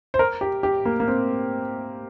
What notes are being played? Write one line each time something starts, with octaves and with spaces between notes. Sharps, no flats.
C5
A#4
G4
G4
A#3
A#3
C4